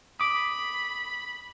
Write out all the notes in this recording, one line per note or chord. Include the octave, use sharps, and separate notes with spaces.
B5 D6 D#6